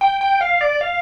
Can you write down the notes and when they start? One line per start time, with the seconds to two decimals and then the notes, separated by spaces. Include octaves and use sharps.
0.01 G5
0.21 G5
0.41 F5
0.61 D5
0.81 F5